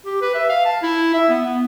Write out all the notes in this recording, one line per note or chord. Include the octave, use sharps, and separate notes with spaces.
G4
B4
E5
F5
A5
E4
E5
B3
B3